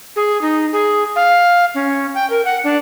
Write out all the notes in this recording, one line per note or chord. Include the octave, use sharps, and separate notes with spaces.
G#4
D#4
G#4
F5
C#4
G5
A#4
F#5
D4